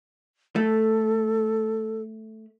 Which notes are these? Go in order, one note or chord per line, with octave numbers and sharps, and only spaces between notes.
A3 A4